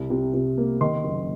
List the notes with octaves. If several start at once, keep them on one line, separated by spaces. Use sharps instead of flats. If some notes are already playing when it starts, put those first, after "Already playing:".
Already playing: C2
C3
C3
A#3
D#3 C6
F#1